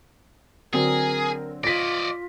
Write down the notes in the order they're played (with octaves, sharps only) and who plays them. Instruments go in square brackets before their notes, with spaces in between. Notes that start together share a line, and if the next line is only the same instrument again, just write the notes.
[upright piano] D3 F#3 C4 [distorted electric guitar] G#4 [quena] A#4
[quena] F4 [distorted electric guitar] D5 D#5 [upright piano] A#6 B6